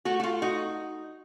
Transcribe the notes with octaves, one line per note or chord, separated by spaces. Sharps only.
A3 F#4
F#4
F4
D#4 F#4